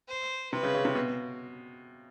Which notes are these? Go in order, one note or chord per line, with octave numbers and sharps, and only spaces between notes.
C5
C3 B4
C#3
C#3
C3
B2